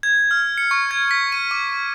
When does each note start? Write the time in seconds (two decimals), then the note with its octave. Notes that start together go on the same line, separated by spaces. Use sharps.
0.03 G#6
0.31 F6
0.58 C#7
0.71 C#6
0.91 G#6
1.11 B6
1.32 D#7
1.51 D6